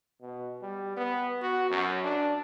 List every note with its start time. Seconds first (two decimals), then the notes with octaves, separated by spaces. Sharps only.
0.21 B2
0.62 G3
0.97 B3
1.42 F#4
1.70 F#2
2.04 D4